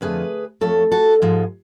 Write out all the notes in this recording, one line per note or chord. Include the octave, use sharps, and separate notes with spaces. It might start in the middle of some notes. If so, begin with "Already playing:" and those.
F2 D3 F3 A3 G#4 B4
F2 D3 F3 A3 A4 C#5
F#4 A4
G#2 F3 G#3